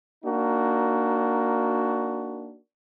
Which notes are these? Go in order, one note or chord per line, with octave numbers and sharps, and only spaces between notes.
A#3 D4 D#4 F#4